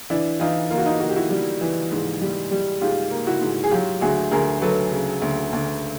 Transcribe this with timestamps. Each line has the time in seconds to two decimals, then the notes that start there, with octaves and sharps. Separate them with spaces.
0.10 E3 D4 E4
0.40 E3 D#4 F4
0.71 A#3 F4
0.78 F#4
0.85 D#4 F4
1.00 A#3 F#4
1.09 G4
1.16 E4 F#4
1.30 G3
1.61 E3
1.92 G#2
2.22 G3
2.51 G3
2.81 G#2 F4 G4
3.11 A#3
3.27 E4 F#4
3.41 G#2
3.64 G#4
3.71 F#3 F4 G4
4.01 D2 F#4 G#4
4.32 D2 G#4 A#4
4.61 F#3 A4 B4
4.92 C#3
5.22 D2
5.53 D2